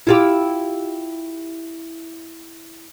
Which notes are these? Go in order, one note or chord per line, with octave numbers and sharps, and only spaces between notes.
E4 F4 G4